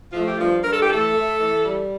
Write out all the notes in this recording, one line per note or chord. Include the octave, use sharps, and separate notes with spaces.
F3 A3 F4
G4
G2 F3 F4
G2 A#4
A4
G4
E3 A3 A4
A3
E3
G3